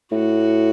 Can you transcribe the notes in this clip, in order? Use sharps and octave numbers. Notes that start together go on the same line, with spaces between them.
A2 F#4